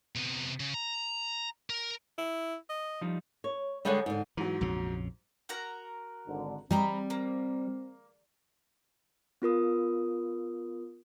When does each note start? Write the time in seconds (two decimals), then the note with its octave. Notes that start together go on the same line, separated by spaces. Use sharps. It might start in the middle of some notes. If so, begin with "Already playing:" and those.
0.15 C3 B3
0.60 C#3
0.74 A#5
1.70 A#4
2.18 E4
2.70 D#5
3.01 F3 G3 D#4
3.44 C#5
3.85 D3 G3 G#3 G#4 C#5 F#5
4.06 G#2 D3
4.37 G#2 E3 F#3
4.61 A#1 F2 C#3
5.49 F#4 A#4 A#5
6.28 G#1 D3
6.71 G3 C4 D#5 A#5 B5
7.10 A#3
9.42 B3 F4 A#4 D#6